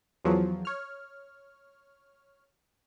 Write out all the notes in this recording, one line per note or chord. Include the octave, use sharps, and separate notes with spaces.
E2 F3 F#3
C#5 F6